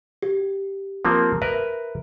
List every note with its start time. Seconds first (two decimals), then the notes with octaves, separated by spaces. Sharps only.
0.23 G4
1.05 F3 A#3 C4
1.42 A#4 B4 E5